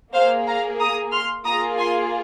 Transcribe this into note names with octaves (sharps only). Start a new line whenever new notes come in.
A#3 G#4 C5 F5
F5 A#5
A#5 D#6
C6 F6
A#3 F4 G#4 A#5 D#6
G#5 C6